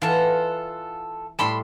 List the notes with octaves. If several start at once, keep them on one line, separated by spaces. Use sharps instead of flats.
E3 F4 A4 F#5
A2 G3 A5 B5 C6